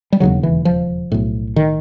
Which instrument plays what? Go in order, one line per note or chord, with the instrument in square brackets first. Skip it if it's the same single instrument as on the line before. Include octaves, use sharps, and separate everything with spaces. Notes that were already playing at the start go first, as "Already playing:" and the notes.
[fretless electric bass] G3
E1 D#2 C#3 F#3
E3
F3
B1 A2
D#3